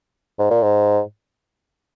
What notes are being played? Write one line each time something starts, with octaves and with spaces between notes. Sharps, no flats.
G#2
A#2
G#2